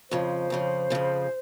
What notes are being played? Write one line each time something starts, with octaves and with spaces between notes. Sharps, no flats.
F2 C#3 F3 C5
F2 C#3 F3
F2 C#3 F3